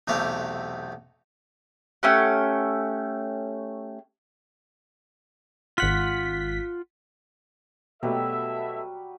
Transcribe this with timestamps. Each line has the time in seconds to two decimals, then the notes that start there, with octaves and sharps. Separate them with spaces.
0.08 B1 E2 C3 A3 G4 F5
2.03 A3 C#4 G4 F#5
5.78 G#1 F4 F#5 B6
8.03 B2 F#3 G3 A3 A4 B4 E5